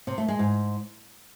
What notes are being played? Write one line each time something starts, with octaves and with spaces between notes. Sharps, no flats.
C3
A3
G#3
G#2